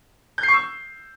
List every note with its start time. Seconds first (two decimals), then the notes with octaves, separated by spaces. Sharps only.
0.38 G6
0.43 C7
0.48 C#6
0.54 E6